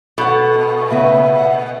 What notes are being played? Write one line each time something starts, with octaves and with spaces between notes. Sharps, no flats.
B2 A4 F#5
C#3 B3 B4 E5
F#5